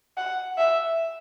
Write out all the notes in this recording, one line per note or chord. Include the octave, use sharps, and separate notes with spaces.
F#5
E5